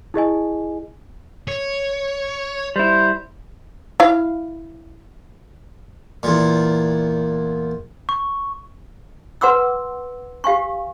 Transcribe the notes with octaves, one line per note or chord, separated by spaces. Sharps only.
E4 G#4 D#5 G#5
C#5
G3 E4 C5
E4 F5
E2 A#2
C#6
B4 F#5 C6 D6 E6
G4 F5 G#5 C#6